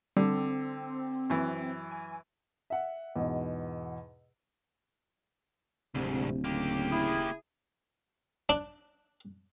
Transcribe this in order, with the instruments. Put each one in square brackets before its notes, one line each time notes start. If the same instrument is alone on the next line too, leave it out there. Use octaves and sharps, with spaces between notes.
[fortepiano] D3 [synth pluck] G3 [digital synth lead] C4
[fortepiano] F#2 E3
[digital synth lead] G#5
[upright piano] E5 F#5
E2 G#2 B2
[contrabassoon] D1 [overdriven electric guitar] D2 G#2 [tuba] C3
[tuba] C#3 [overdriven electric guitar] A#3 G4
[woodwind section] E4 G#4
[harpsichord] D4